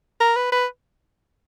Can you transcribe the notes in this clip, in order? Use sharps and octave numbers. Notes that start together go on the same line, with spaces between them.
A#4
B4
B4